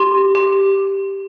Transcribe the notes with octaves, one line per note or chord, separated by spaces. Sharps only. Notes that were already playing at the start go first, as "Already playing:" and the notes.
Already playing: G4 C6
G4